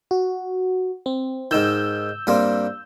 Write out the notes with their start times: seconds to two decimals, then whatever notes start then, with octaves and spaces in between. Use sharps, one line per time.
0.11 F#4
1.06 C4
1.51 G#2 D#3 E6 G6
2.27 G2 A#3 C4